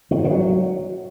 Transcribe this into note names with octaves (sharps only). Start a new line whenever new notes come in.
D#3
G2
C#3
F#3